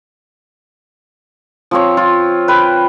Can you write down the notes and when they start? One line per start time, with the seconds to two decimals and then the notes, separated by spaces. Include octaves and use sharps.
1.71 F3 C4 C#5
1.97 F4
2.48 B4 G5